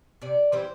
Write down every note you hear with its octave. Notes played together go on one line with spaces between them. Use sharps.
C3 D5
E3 G3 C4 C5